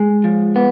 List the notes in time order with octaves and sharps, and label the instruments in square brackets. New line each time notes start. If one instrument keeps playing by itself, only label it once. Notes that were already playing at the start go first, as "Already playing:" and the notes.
Already playing: [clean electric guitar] G#3
F3
B3